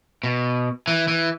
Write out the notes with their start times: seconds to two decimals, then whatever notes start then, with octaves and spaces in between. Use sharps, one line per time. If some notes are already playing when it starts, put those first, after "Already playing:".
0.24 B2
0.88 E3
1.08 E3